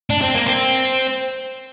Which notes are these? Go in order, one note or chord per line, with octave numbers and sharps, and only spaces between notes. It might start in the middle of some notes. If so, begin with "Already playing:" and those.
D4
C4
A#3
C4